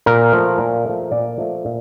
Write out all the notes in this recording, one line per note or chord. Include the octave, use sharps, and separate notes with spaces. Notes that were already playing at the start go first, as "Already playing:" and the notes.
A#2 A#4
F3 A3
A#2
F3 A3
A#2 D5
F3 A3
A#2